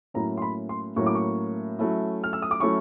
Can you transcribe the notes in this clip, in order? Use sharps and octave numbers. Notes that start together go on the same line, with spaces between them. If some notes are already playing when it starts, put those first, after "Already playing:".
A2 F#3 A#3 C#4 E4 A#5
C6
B5
C6
A2 F#3 A#3 C#4 E4 C#6
D6
C#6
F#3 A3 C#4 E4
F6
E6
D#6
D6
F#3 A3 C#4 E4 C#6